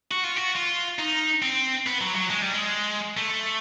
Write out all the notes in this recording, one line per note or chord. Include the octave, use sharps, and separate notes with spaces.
F#4
F4
F#4
F4
D#4
C4
B3
F#3
F#3
G#3
G3
G#3
A3